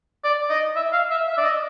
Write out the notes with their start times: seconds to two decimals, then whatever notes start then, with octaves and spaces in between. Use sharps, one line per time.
0.24 D5
0.49 D#5
0.76 E5
0.93 F5
1.11 E5
1.27 E5
1.38 D5
1.44 D#5